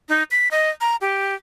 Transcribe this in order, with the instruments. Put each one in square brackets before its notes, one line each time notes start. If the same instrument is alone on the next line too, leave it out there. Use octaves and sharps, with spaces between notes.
[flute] D#4
B6
D#5
A#5
G4